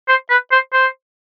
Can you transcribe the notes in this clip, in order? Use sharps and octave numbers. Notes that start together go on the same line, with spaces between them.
C5
B4
C5
C5